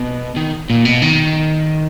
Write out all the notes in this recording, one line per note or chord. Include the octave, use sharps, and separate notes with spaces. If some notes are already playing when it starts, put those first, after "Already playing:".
Already playing: B2
D#3
A#2
B2
D#3